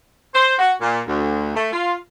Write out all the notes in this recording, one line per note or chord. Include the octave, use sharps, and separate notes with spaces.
C5
F#4
A#2
D2
A3
F4